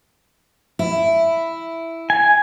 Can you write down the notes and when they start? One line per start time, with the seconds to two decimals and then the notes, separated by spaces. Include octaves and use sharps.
0.79 E4
2.10 G#5